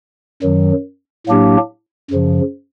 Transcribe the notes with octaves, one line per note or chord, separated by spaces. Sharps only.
F#2 D#3 F#3
A2 F#3 A#3 D4 G4
F#2 C#3 F3